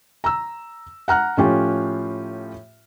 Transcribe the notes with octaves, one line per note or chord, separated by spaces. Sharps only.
A#5 E6
F#5 A#5 F6 F#6
A2 F3 C#4 F4 G4